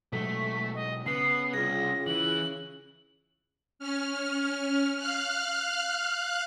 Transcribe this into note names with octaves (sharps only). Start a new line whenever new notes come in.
B2 F#3 G#3 A3 B6
D#5
C#3 B3 C7
C2 F4 G#4 A#6
E3 F#7
C#4 F6
F5 F6 F#6